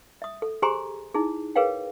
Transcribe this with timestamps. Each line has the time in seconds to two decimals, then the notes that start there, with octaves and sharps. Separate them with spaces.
0.22 E5 D#6
0.42 A4
0.62 G4 G#4 C5 G#5 A#5 C6
1.15 D#4 E4 G#4
1.56 G#4 A#4 B4 C#5 F5 G5